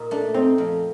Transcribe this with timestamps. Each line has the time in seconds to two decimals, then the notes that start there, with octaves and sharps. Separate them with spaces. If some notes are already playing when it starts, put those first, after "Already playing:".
Already playing: A#2 D#4
0.11 A3 D4
0.34 C4 D#4
0.58 F2